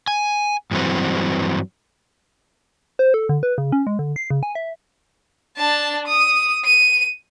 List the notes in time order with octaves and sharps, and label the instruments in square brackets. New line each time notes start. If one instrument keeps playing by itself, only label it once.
[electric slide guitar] G#5
G2 E3 F#3 C4
[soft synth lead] C5
A4
D3
B4
C#3
C#4
G#3
D3
C7
C#3
G#5
E5
[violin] D4 A5
D#6
D#7